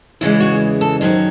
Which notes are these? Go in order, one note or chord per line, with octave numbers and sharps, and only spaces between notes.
E2 C#3 E3 G#3 E4
F#4
A4
F#2 D#3 F#3 C5